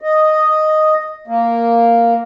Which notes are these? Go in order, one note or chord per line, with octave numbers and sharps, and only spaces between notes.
D#5
A#3